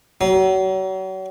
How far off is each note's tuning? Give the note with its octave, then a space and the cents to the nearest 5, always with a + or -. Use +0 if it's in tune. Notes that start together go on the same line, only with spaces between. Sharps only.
F#3 +35